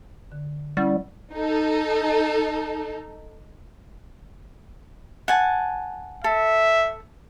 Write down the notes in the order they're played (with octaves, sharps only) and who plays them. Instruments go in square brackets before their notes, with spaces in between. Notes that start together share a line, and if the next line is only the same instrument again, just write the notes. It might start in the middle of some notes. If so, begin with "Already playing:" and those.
[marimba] D3
[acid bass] G3 [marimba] C#4 E4 F#5
[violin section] D#4 A4
[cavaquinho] F#5 G#5 A5
[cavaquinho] A4 [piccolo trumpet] E5